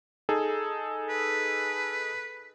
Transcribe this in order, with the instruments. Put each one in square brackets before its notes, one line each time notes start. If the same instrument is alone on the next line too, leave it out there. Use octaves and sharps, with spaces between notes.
[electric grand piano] D#4 G#4 A4
[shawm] B4